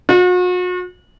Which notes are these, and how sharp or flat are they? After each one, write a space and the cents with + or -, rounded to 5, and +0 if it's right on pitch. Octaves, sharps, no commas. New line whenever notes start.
F#4 -40